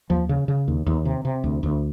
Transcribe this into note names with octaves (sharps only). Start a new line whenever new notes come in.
D#2 F3
C#3
C#3
D#2
D#2
C3
C3
D2
D2